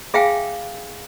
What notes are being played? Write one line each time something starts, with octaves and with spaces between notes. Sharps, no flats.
G#4 E5 F5 G5 G#5